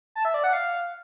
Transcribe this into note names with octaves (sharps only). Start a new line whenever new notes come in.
A5
E5
D5
F#5
F5